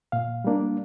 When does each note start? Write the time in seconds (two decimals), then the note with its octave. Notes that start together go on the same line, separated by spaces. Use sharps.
0.12 A#2 F5
0.44 G3 A#3 D4